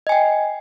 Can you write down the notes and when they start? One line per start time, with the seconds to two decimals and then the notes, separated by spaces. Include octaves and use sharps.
0.07 D#5
0.09 G#5
0.12 G5